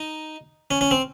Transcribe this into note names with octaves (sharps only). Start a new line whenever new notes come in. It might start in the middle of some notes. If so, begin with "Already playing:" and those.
Already playing: D#4
C#4
C#4
C4